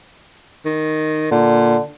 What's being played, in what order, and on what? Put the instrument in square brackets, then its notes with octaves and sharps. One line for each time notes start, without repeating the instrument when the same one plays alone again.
[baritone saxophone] D#3
[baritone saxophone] A#2 [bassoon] D3